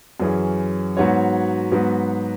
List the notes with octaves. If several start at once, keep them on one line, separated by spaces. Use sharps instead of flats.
F#2 E3 C#4 G#4
G#2 F#3 B3 F#4 C#5
G#2 F#3 B3 F#4